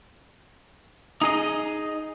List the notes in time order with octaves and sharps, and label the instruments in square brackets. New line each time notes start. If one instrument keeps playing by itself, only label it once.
[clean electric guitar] D#4 G#4 D#5